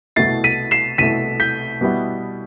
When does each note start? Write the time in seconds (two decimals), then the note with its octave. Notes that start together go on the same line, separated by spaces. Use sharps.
0.16 C2 B2 A3 E4 A6 C7
0.44 B6 D#7
0.71 C7 E7
0.98 C2 B2 A3 E4 B6 D#7
1.40 G6 B6
1.81 B2 G3 B3 E4